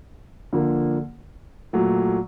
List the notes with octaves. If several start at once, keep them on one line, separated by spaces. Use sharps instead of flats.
D3 F3 A#3
A#2 F#3 A3